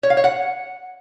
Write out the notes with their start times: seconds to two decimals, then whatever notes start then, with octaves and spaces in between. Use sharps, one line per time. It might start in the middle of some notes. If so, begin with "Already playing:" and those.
0.03 C#5
0.10 F5
0.17 C#5
0.24 F#5